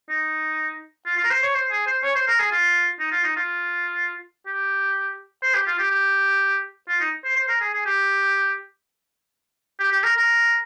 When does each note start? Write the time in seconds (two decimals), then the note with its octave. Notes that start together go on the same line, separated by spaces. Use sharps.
0.09 D#4
1.06 F4
1.18 F4
1.24 A#4
1.31 C5
1.43 C#5
1.55 C5
1.71 G#4
1.87 C5
2.03 C#5
2.16 C5
2.28 A#4
2.39 G#4
2.52 F4
3.00 D#4
3.12 F4
3.24 D#4
3.36 F4
4.46 G4
5.43 C5
5.55 G4
5.67 F4
5.79 G4
5.91 G4
6.88 F4
7.00 D#4
7.25 C5
7.36 C5
7.49 A#4
7.61 G#4
7.74 G#4
7.86 G4
9.80 G4
9.92 G4
10.03 A#4
10.16 A#4